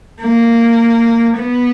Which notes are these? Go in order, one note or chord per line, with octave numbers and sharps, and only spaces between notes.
A#3
B3